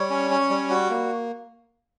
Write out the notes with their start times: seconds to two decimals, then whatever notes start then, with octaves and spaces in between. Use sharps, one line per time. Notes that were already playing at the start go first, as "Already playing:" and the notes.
Already playing: G3 C#5
0.10 C#4
0.30 C#4
0.50 G3
0.70 F#4
0.90 A#3